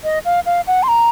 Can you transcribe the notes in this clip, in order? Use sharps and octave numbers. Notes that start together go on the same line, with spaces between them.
D#5
F5
F5
F#5
C6
A#5